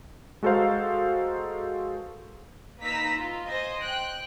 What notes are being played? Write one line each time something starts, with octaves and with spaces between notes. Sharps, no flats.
G#3 F#4 A4 A#4 C5 F5
A#3 D#4 B4 A#5 E6 B6
F4
C5 D#5 G#5
G5 F#6